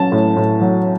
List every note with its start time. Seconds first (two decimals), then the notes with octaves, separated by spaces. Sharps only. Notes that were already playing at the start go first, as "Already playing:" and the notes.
Already playing: F#3 C#4 A5
0.12 A2
0.37 A2
0.61 F#3